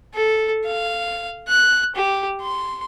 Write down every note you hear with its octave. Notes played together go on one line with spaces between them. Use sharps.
A4
F5
F#6
G4
C6